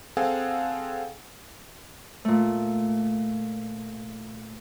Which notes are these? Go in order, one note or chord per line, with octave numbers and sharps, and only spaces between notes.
C4 G#4 A4 F5 F#5 G#5
A#2 A3